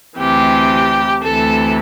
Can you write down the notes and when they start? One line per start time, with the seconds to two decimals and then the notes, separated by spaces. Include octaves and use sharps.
0.17 D2 C3 E3 G4
1.22 D2 C3 E3 A4